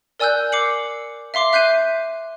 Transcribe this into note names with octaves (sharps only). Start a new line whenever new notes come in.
A#4 D5 G#5 E6 F#6 G6
D6 C7 C#7 F#7
E5 F5 C6 D6 C7
E5 F#6 G6 C7 D#7